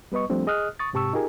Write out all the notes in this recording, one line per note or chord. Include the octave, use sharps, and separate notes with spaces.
G3 B3 B4 D#5 C#6
F3 G3 A3 C4 D4
G#4 D#5 D#6 F6 F#6
C#6 D#6 A6
G#2 C3 G4 A5 C#6 E6
D#4 F4 G4 G#4 A#4 G#5